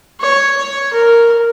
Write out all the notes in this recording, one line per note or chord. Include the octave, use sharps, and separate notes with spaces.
C#5
C#5
A#4